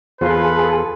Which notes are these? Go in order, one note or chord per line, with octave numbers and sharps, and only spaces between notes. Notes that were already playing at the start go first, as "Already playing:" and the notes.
E2 F4 G#4 A4 B4 C5 F5 C6